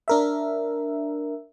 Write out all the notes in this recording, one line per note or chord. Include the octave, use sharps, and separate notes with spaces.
D4 A#4 E5